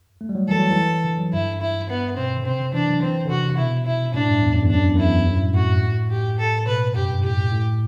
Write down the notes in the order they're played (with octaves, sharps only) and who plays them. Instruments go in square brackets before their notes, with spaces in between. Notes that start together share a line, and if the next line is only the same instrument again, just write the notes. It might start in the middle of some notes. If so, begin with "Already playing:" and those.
[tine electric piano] A3
G3
F#3
[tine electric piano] E3 [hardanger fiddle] A4
[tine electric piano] F#3
E3
D3
F#3
[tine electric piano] G2 [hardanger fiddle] E4
[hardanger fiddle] E4
B3
[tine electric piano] B2 [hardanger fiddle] C4
[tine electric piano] D3
[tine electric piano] C3 [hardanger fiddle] C4
[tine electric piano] D3
[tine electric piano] E3 [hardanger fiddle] D4
[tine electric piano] F#3
[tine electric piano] E3 [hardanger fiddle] C4
[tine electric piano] D3
[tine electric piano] C3 [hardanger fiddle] F#4
[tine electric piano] C3
[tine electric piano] B2 [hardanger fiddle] E4
[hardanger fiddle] E4
[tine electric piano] A2 [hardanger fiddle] D4
[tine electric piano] G2
E2
F#2
E2
[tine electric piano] F#2 [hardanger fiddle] D4
[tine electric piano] E2
[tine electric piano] F#2 [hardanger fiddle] E4
[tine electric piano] E2
F#2
A2
G2
[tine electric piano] A2 [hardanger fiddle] F#4
[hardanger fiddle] G4
A4
[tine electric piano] B2 [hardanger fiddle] B4
[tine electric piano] F#2 [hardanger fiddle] G4
[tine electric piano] G2
[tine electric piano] A2 [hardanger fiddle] G4
[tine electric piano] A2